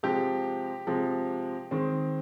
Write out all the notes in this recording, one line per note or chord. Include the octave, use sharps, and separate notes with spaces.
C3 F3 G#3 G4
C3 F3 G#3
D#3 G#3 C4